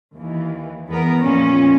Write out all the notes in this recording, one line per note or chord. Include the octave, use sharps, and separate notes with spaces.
D#2 E3
E2 B3 A#4
F2 A#2 C#4